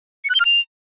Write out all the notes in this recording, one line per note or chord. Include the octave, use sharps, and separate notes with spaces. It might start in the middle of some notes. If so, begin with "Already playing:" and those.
C#7
F#6
G7
F6
F7